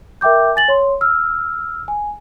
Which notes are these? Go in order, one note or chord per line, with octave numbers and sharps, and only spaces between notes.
A#4 E5 G5 D6 G6
G#5 A6 F#7
C#5 C6
E6 F6
G#5